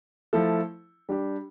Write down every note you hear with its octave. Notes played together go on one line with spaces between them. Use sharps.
F3 A3 E4 A4
G3 D4 G4